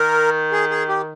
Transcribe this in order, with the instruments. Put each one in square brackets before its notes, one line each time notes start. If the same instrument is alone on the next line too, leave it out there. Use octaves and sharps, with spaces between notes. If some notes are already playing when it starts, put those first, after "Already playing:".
Already playing: [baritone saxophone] D#3 [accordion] A#4
[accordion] G#4
G#4
G4